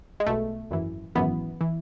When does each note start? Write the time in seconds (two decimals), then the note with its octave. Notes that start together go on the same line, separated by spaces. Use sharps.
0.20 G#3
0.26 B1 B2 A3
0.71 G#1 F#2 E3
1.15 G#1 F#2 E3 B3
1.61 E3